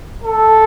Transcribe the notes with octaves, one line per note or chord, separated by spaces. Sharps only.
A4